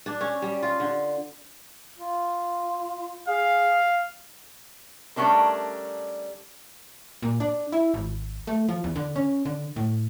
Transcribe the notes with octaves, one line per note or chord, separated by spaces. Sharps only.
D4
C#4
G3
F4
D3
F4
G#4 F5
G3 A3 C#4 D4 A#4
A#2
D4
E4
G#1
A3
F3
E2
D3
C#4
D3
A2